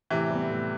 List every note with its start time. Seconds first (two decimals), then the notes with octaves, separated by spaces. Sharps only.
0.11 A2 C3 E3
0.30 G3 B3
0.50 A2